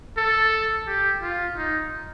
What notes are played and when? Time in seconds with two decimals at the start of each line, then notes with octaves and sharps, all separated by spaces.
0.17 A4
0.87 G4
1.22 F4
1.56 D#4